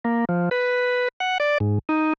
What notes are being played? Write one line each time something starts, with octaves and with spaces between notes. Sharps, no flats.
A#3
F3
B4
F#5
D5
G#2
D#4